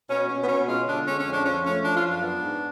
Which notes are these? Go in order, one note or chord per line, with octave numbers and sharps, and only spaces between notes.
B2 C#4
B2 C#4
B3
B2 C#4
G#3 F4
D3 D4
G#3 C#4
C#4
F2
D4
F3 C#4
A3 C#4
F3 D4
F4
F#2
D4
B3
G#2